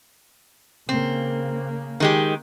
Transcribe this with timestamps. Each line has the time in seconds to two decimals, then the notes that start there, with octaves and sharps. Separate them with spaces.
0.89 C#3 A#3 C4
2.00 D#3 G#3 G4